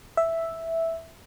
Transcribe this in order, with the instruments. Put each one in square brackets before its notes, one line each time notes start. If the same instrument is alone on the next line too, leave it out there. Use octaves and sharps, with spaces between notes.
[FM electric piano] E5